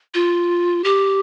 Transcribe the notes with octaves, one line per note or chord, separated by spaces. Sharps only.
F4
G4